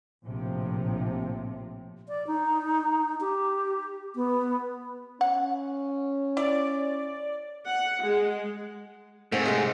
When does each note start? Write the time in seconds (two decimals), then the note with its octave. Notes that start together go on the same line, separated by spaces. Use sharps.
0.23 A#1 A2 C3 F3
2.09 D5
2.27 D#4
3.21 G4
4.16 B3
5.21 C#4 F#5
6.37 E4 D5
7.67 F#5
8.03 G#3
9.32 G#2 A3 C4
9.45 C3 G#3 A3